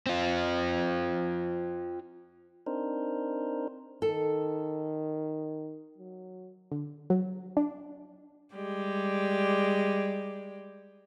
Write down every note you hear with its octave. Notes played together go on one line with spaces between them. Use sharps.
C4 F4
C4 D4 D#4 A#4 C5
D#3 A4
F#3
D3
F#3
D4
G3 G#3 G4 D5